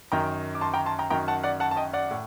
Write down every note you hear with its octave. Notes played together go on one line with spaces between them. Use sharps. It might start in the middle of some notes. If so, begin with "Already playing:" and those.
F#2 D#3 G5 A#5
D6
A5 C6
G5 A#5
A5 C6
G5 A#5
F#2 D#3 G5 A#5
F#5 A5
D5 F#5
F#5 A5
A5
D#5 G5
D5 F#5
A2